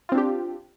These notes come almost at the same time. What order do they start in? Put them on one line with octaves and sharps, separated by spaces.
F4 C4 D4 G4